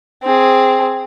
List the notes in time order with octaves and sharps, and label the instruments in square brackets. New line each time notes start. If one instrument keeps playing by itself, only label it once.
[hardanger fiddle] C4 G#4